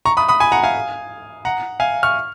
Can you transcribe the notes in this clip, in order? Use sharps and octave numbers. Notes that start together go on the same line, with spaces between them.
A#5 C#6
B5 D#6
B5 D#6
G#5 B5
F#5 A#5
F5 G#5
F#5 A#5
F5 G#5
C#6 F6